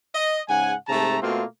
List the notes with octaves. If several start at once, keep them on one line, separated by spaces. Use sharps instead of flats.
D#5
G#2 C#3 F#5 G#5
G#2 C3 A3 A5 A#5
B2 A3 A#3 C4 F4